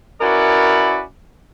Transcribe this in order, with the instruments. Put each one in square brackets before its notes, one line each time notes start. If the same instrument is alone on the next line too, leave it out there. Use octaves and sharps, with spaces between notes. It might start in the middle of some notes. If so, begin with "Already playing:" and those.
[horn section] C#4 E4 F#4 A#4 B4 D5